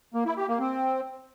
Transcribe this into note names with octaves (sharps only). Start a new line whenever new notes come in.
A#3
E4
G4
A#3
C4